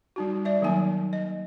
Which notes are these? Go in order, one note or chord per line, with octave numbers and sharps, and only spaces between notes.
G3 D#4 F#4
D5 E5
D#3 F#3 A#3 D#4 G#5
D#5